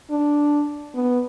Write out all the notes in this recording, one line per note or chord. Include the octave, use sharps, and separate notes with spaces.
D4
B3